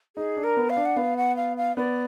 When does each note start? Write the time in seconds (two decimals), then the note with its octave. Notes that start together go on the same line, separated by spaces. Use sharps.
0.16 D#4 G#4
0.37 D4
0.44 A#4
0.57 B3
0.70 F5
0.76 D4
0.85 F#5
0.96 B3 F5
1.17 F#5
1.36 F5
1.57 F5
1.77 B3 D5